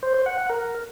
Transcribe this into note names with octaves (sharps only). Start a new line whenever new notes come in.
C5
C5
F#5
F#5
A#4